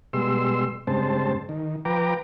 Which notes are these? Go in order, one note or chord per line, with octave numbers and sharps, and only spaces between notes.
B2 G3 G#3 C6 E6
G2 C#3 G#3 C4 C5 A5
D#3
F3 B4 G5 A#5 D6